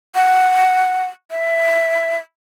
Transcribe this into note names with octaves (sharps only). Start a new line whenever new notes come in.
F#5
E5